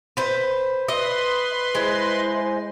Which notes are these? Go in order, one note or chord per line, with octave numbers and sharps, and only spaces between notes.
B4 C5
B4 D#5 C6
G#3 E4 C5 D#5